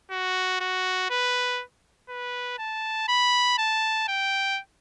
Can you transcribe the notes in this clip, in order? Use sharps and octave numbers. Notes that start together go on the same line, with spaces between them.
F#4
F#4
B4
B4
A5
B5
A5
G5